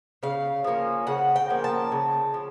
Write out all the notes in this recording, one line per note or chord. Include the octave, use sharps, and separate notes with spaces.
C#3 F5
F3 A#3 C#4
C#3 F#5
G5
F3 A#3 C#4
A5
C#3
F3